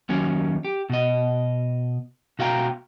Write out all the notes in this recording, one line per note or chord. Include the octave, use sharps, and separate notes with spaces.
D#2 F#3 C#4
G4
B2 D#5
B2 F#4 F5 G5 A#5